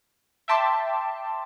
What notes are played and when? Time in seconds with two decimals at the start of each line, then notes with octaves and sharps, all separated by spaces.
0.48 E5 G5 A5 C6 D6